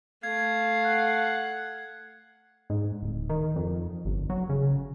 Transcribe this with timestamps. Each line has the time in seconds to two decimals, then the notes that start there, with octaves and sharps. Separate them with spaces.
0.23 A3 F5 G#6
0.85 F#5
2.70 G#2
3.03 D1
3.30 D#3
3.56 F2
4.05 G1
4.30 F#3
4.49 C#3